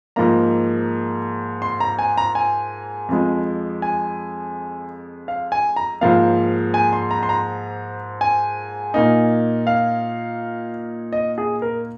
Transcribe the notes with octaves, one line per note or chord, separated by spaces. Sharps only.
G#2 F3 A#3 D#4 A#5
C6
A#5
G#5
A#5
G#5
F2 F3 G#3
G#5
F5
G#5
A#5
G#2 F3 A#3 F5
G#5
C6
A#5
C6
A#5
G#5
A#2 A#3 D#4
F5
D#5
G#4
A#4